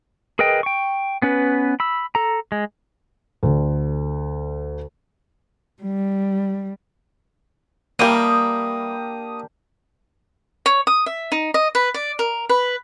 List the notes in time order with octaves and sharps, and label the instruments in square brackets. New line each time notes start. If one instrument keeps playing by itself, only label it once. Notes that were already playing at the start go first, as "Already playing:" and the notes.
[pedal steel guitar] G#4 A#4 B4 D#5 G5
G5 C#6
B3 C#4 B4
B5 E6
A4 A#5
G#3
[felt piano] D2 D3
[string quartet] G3
[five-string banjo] E3 G3 [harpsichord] A#3 [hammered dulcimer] D4 G4 A#4 [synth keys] D#6
[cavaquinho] C#5
D#6
E5
D#4
D#5
B4
D5
A#4
B4